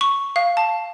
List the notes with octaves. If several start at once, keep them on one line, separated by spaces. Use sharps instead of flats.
C#6
F5
A5